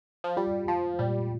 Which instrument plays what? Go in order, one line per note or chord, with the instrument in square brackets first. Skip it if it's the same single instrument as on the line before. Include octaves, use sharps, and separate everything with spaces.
[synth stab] F3
[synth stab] G3 [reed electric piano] F4
[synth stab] F3 [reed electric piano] F4
[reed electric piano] A#2 [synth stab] G3